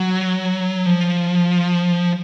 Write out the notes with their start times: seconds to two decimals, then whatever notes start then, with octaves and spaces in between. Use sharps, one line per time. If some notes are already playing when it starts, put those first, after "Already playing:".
Already playing: F#3
0.86 F3